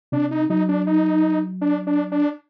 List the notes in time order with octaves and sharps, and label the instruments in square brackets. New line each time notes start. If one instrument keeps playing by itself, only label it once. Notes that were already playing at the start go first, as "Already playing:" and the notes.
[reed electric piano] C3 [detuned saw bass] D4
[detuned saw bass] D#4
[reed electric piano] F#3 [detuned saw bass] D#4
[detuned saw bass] D4
D#4
D4
D4
D4